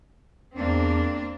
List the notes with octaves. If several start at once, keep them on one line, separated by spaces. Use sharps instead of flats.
E2 A#3 C4 D4